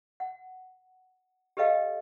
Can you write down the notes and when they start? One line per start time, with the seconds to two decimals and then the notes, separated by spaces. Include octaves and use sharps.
0.20 F#5
1.57 G4 A4 B4 D#5 F5 G5